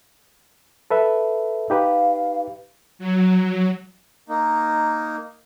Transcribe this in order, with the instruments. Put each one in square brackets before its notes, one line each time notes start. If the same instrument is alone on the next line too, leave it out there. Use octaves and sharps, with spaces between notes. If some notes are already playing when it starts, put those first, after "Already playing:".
[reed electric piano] A4 B4 E5
[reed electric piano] D#4 G4 B4 [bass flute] F5
[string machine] F#3
[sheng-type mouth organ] A#3 D#4